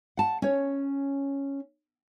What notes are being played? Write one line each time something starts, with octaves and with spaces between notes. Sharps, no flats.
F#5 A5
C#4 C#5